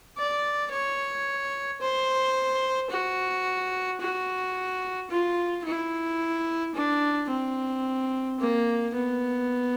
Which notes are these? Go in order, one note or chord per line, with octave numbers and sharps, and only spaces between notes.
D5
C#5
C5
F#4
F#4
F4
E4
D4
C4
A#3
B3